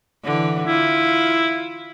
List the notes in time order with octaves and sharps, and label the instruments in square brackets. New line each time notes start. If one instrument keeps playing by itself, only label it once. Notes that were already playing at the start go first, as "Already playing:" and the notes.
[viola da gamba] D3 E3
[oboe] E4 [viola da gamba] F4